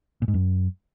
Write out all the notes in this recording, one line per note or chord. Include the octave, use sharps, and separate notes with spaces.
A#2
G#2
F#2